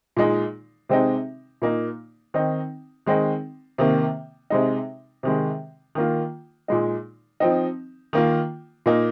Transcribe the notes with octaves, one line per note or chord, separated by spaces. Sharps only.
A#2 G#3 D#4
C3 G#3 C4 D#4
A#2 A#3 D#4
D#3 C4 D#4
D#3 G#3 C4 D#4
C3 D#3 A#3
C3 G#3 D#4
C3 D#3 G#3
D#3 A#3 F4
A#2 G#3 D#4
F3 C4 D#4
D#3 A#3 F4
A#2 A#3 D#4